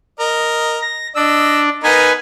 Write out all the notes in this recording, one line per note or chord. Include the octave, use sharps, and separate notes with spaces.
A#4 D#5
A#6
D4 D#5 E6
B3 D#4 A#4 B4 G#5